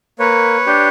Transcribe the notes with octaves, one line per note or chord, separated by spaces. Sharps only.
A#3 B4 C#5
D4 G4